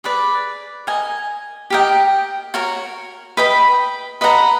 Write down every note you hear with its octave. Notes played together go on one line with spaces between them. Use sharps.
G#4 B4 D5
A#4 D#5 G#5
G4 A#4 D#5 G5
F#4 A#4 C#5
B4 D#5 G5 B5
B4 D#5 F#5 A#5